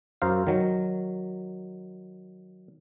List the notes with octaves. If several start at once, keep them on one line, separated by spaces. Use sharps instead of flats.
F#2 A#4 C5 F5
D#3 F#3